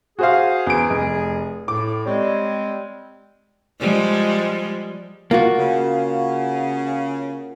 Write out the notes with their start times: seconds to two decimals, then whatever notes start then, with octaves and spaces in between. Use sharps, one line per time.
0.19 F#4 G#4 C5 F5
0.67 E2 D7
0.90 F1
1.68 A2 D6
2.05 G3 G#3 C4 C#5
3.81 F3 G3 G#3
5.31 A#3 F4 F#4
5.58 C#3